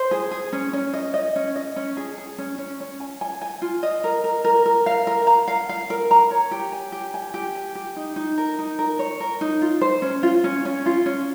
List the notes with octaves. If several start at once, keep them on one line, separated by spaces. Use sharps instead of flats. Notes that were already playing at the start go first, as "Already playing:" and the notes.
Already playing: C5
G#4
G#4
C#4
C#4
D#5
D#5
C#4
D#5
C#4
G#4
G#4
C#4
C#4
C#4
G#5
G#5
G#5
F4
D#5
A#4
A#4
A#4
A#4
F5
A#4
A#5
F5
F5
A#4
A#5
C#5
G4
G#5
G4
G#5
G4
G#5
G4
D#4
D#4
A#4
D#4
A#4
C#5
A#4
D#4
F4
C5
C#4
F4
C#4
C#4
F4
C#4